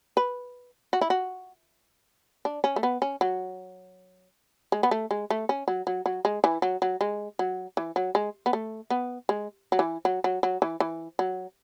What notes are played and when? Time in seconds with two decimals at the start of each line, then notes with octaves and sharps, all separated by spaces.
0.17 B4
0.93 F#4
1.01 E4
1.10 F#4
2.45 D4
2.64 C#4
2.76 A3
2.83 B3
3.02 C#4
3.21 F#3
4.72 G#3
4.83 B3
4.91 A3
5.11 G#3
5.30 A3
5.49 C#4
5.68 F#3
5.87 F#3
6.06 F#3
6.25 G#3
6.44 E3
6.62 F#3
6.82 F#3
7.01 G#3
7.39 F#3
7.77 E3
7.96 F#3
8.15 G#3
8.46 B3
8.53 A3
8.90 B3
9.29 G#3
9.72 F#3
9.79 E3
10.05 F#3
10.24 F#3
10.43 F#3
10.62 E3
10.80 E3
11.19 F#3